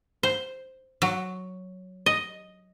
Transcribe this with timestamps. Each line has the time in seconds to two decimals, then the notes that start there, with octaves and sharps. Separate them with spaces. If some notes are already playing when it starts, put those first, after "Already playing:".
0.23 C5
1.02 F#3
2.06 D#5